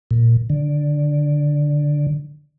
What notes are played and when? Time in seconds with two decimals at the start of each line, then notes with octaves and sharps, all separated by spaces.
0.11 A#2
0.50 D3